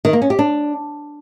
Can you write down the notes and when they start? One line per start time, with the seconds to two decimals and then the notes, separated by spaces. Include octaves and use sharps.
0.05 D#3
0.13 A#3
0.22 C#4
0.30 G4
0.39 D4